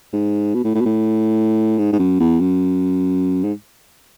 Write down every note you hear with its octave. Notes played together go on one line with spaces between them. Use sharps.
G#2
B2
A2
A2
B2
A2
G#2
G#2
F#2
E2
F#2
G#2